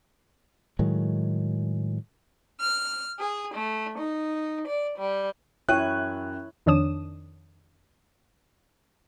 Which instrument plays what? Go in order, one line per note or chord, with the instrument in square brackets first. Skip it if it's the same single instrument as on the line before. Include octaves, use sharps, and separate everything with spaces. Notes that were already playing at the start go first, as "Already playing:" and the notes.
[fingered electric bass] A2 D#3 F#3 G#3
[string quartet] F6
G#4
A3
D#4
D5
G3
[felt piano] F#2 [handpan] E4 C#5 [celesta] E5 G5 D#7 [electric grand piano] F#6
[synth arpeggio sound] F2 D#3 D4 C#5 D#6 E7